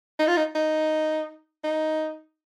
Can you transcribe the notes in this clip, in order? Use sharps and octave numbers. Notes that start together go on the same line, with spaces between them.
D#4
F4
D#4
D#4
D#4